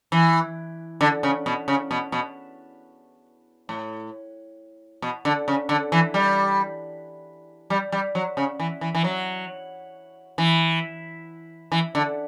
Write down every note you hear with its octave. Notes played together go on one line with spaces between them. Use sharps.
E3
D3
C#3
B2
C#3
B2
B2
A2
B2
D3
C#3
D3
E3
G3
G3
G3
F#3
C#3
E3
E3
E3
F#3
E3
E3
D3